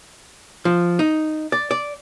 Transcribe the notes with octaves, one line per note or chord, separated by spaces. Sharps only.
F3
D#4
D5
D5